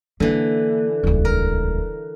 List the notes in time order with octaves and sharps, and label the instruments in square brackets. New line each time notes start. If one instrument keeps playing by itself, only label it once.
[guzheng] D3 E3 [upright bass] A#3
[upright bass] D#1 C#2
[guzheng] A#4